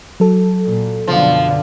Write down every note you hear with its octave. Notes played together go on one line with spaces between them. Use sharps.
F#3 A4
A#2
F#2 B2 D3 F3